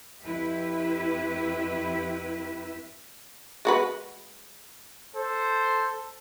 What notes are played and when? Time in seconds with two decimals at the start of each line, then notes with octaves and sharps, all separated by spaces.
0.23 F2 E4 G4 B4 E5
3.65 G#3 F#4 B4
5.15 A4 C5